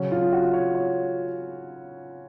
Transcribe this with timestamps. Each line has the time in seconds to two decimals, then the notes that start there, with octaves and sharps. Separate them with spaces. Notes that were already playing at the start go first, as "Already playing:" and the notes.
Already playing: C#3 F#3 C#4
0.12 F4
0.33 F#4
0.54 C#5
0.75 C#5